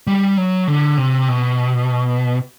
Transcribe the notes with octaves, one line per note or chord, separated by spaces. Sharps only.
G3
F#3
D3
C3
B2